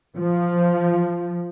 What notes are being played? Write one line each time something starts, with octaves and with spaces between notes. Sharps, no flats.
F3